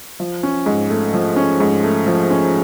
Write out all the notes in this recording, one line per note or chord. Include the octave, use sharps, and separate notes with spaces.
F3
C#4
G#2
A3
F3
C#4
G#2
A3
F3
C#4